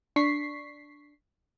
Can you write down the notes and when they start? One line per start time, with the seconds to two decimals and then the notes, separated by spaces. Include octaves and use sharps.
0.16 D4 C#6 B6 C7